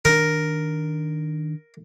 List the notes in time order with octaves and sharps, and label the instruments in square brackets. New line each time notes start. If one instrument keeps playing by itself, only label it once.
[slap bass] D#3 D4 [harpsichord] A#4